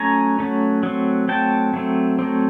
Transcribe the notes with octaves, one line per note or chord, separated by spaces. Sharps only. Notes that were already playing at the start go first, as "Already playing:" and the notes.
Already playing: F#3 A3 C#4 G#5 A#5
F#3 A3 C#4
F#3 A3 C4
F#3 A3 C4 G5 A5
F#3 A3 C4
F#3 A3 C4